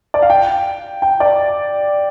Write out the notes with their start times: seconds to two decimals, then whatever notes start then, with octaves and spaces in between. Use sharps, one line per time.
0.14 D5
0.22 F5
0.30 G5
1.02 G5
1.20 D5